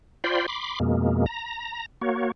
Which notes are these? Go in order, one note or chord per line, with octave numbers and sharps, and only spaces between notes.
F4 C5 D5 G5 B5 C6
B5 C6 D6
F2 B2 G#3 A#3
A#5
A#3 F#4 C#5